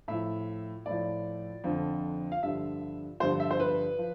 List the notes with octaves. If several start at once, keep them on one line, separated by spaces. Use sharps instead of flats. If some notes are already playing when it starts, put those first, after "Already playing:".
A2 F3 E5
A2 F3 D5
F2 D3 F3
F5
G2 D3 F3 E5
G2 D3 F3 C5
E5
C5
B4
F3